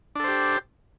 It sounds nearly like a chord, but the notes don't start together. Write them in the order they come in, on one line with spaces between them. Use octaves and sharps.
D4 A4 C5 G4